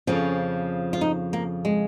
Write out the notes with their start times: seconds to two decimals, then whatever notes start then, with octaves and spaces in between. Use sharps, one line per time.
0.07 F2 C#3 F3 C#4
0.93 F4
1.01 D#4
1.33 A#3
1.65 G#3